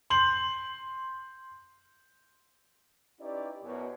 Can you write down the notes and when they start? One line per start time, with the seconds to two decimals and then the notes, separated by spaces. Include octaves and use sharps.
0.10 C6 G6 F#7
3.19 C#4 D#4 E4 G4 B4 D5
3.63 F#2 B2